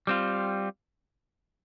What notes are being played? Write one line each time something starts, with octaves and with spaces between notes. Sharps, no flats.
G3 C4 F4